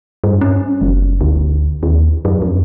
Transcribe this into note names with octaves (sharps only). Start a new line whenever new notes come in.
G2
C#4
F#1
D2
D#2
F#2
F2